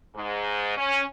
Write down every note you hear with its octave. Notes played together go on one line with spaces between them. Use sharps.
G#2
C#4